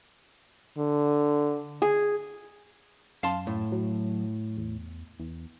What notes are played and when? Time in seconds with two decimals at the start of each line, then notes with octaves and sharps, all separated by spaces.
0.78 D3
1.82 G#4
3.23 F#2 F5 A5 C6
3.47 A2
3.72 F#3
4.57 E2
5.20 E2